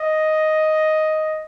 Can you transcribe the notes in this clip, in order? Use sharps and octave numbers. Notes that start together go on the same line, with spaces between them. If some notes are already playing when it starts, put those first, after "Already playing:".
Already playing: D#5